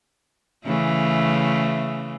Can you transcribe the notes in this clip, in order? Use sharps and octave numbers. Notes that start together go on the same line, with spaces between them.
C#3 E3 A3